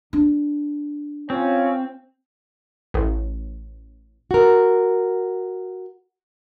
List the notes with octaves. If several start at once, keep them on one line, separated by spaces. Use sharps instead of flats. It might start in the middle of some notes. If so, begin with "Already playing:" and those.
D4
C4 C#4 F4
A1
F#4 A#4